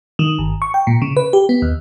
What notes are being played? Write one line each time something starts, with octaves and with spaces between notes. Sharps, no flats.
D#3
G1
C#6
G5
A#2
C#3
B4
G4
B3
D#2